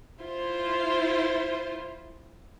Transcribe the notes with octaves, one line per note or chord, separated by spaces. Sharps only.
E4 F4 C5